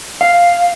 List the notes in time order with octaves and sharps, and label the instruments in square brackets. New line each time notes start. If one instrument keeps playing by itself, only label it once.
[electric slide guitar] F5